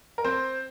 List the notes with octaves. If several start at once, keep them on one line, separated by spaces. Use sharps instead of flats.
A#4
C4 C5